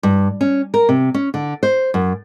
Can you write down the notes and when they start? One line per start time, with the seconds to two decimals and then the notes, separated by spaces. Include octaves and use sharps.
0.03 G2
0.41 C#4
0.74 A#4
0.89 C3
1.14 C#4
1.34 D3
1.63 C5
1.94 F#2